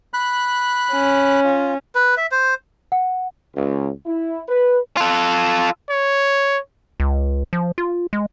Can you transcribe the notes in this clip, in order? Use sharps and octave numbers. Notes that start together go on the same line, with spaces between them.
B5 F#6
C#4
F4
B4
E5
C5
F#5
C#2
E4
B4
F4 A4
C#5
C#2
F3
F4
G#3